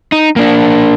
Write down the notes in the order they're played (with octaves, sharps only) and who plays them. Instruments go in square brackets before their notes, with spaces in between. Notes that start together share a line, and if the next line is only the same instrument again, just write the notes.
[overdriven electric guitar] D#4
A#3 D4